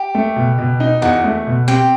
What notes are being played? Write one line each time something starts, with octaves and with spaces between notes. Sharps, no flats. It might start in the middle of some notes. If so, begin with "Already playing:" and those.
Already playing: G4 G5
A3
B2
B2
D#4
E2 F#4 F#5
A3
B2
C4 G4 G5